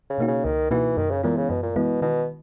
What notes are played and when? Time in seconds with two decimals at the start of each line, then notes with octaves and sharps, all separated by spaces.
0.10 C#3
0.18 B2 A#3 D#4 F#4
0.27 C#3
0.45 C#2 D#3
0.71 B2 E3 A#3 D#4 F#4
0.97 F#2 D#3
1.10 C#3
1.23 A#2 E3 G#3 B3 E4
1.36 C#3
1.50 F#2 B2
1.62 A#2
1.75 B2 E3 G#3 B3 E4
2.02 B2 D#3